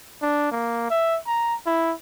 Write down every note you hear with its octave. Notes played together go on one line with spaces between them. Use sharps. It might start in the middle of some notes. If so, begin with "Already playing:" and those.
D4
A#3
E5
A#5
E4